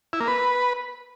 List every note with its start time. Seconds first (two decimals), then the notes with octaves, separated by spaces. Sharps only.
0.13 E4
0.20 A#3
0.28 B4